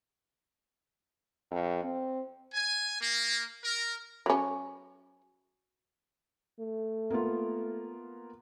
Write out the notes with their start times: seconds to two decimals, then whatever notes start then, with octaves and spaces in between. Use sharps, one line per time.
1.51 F2
1.84 C4
2.54 G#5
3.01 A#3
3.64 A#4
4.26 F#3 C#4
6.60 A3
7.10 A#3 B3 F4